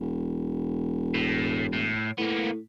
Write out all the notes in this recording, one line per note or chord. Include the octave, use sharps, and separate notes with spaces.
E1
A2
A2
A2 A#3 B3